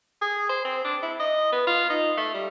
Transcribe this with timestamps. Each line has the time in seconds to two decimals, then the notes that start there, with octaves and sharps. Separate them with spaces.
0.21 G#4
0.49 C5
0.65 C4
0.84 D4
1.02 E4
1.19 D#5
1.52 B3
1.67 F4
1.90 D#4
2.17 A3
2.34 G3